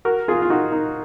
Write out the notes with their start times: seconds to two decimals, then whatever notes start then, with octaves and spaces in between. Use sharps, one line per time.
0.05 F#4 A#4
0.28 F4 G#4
0.42 F4
0.50 D#4 F#4
0.72 D#4